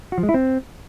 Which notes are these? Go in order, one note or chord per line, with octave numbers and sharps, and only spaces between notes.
F#4
F3
G#3
E4
C4